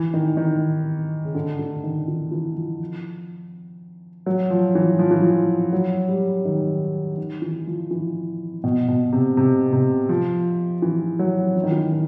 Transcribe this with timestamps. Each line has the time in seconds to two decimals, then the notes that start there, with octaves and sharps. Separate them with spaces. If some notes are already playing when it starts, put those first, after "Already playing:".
Already playing: E3
0.14 D#3
0.37 D#3
1.25 C#3
1.35 D3
1.59 D3
1.84 D#3
2.08 E3
2.32 E3
2.57 F3
4.26 F#3
4.50 F3
4.75 E3
4.99 F3
5.11 E3
5.22 F3
5.73 F#3
6.09 G3
6.45 D#3
7.18 D#3
7.42 E3
7.67 F3
7.91 E3
8.64 B2
8.88 B2
9.12 C3
9.37 C3
9.73 C3
10.09 F3
10.82 E3
11.19 F#3
11.56 E3
11.64 D#3
11.72 E3
11.92 D#3